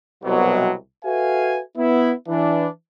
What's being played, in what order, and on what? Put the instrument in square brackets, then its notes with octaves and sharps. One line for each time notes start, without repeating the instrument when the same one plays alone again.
[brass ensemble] C2 B2 F#3
F#4 A4 B4 E5 F5 G#5
B3 E4
E3 D4